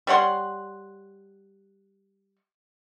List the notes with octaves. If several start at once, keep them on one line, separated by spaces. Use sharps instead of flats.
G3 C#5 F#5 C6